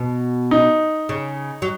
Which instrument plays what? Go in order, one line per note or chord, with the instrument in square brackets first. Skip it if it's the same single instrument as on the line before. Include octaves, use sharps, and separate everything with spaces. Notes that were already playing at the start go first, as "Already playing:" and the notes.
Already playing: [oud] B2
[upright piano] D#4
[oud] C#3
F#3